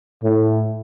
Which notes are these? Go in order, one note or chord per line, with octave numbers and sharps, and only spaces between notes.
A2